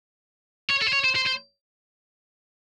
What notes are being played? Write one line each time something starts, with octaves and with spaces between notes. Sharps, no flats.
C#5
A4
C5
C#5
C5
C5
C5